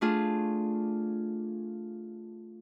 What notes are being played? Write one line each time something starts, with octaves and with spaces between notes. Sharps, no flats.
A3 D4 F4 G#4